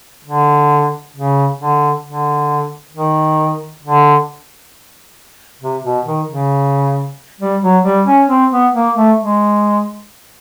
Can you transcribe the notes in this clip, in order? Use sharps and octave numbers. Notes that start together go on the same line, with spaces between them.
D3
C#3
D3
D3
D#3
D3
C3
B2
D#3
C#3
G3
F#3
G3
C#4
C4
B3
A#3
A3
G#3